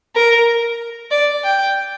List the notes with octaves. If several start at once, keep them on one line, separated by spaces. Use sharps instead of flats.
A#4
D5
G5